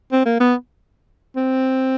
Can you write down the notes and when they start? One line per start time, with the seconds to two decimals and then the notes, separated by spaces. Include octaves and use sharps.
0.12 C4
0.26 A#3
0.40 B3
1.36 C4